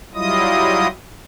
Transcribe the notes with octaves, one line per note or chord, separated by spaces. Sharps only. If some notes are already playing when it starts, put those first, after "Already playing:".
F#3 G3 E4 F4 D#5 D#6